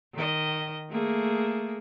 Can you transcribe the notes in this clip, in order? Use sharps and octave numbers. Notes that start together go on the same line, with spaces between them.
D#3 D#5
A3 A#3 G#4